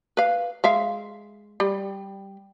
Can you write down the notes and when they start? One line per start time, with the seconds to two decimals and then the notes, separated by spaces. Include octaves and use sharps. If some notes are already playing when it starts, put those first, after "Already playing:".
0.17 B4 F5
0.64 G#3 E5 F5
1.60 G3